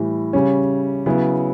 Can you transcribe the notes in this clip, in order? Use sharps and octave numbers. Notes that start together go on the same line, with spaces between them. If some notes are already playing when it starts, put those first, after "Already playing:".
Already playing: A2 E3 G3
C#3 G3 C#4
C#3 F#3 B3 E4